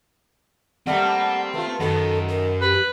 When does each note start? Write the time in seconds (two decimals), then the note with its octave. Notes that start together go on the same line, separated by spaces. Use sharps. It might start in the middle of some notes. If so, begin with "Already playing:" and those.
0.87 G3 A3 A#3 C4 F#5
1.54 A3 F4 B4
1.80 F#2 D#3 B3 A4
2.29 A#4
2.62 G4 B4